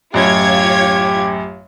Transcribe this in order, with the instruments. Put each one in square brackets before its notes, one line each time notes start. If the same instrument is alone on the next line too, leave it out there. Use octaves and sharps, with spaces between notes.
[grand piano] A1 F#2 [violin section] F4 C#5 G#6 [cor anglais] G4